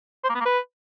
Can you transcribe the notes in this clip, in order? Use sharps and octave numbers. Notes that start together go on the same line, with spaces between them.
C5
A#3
B3
A#3
B4